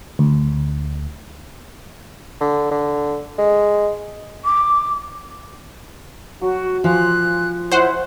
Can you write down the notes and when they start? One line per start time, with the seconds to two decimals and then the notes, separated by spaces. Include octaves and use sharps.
0.19 D2
2.41 D3
2.71 D3
3.38 G#3
4.45 D6
6.41 F#3 F#4
6.84 F3 F5 G#5 C6 F#6
7.72 E4 C5 C#5 F#5